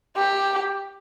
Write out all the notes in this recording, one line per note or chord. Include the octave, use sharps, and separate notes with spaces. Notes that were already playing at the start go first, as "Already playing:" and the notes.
G4